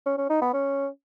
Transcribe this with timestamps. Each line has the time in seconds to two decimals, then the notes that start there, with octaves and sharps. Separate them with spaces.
0.06 C#4
0.18 C#4
0.30 D#4
0.42 B3
0.54 C#4